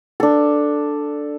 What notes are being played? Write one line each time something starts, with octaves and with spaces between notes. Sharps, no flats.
D4 A4